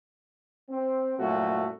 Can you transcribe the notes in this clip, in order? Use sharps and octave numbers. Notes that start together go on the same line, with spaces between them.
C4
C2 F#2 A#2 F#3 A3 F#4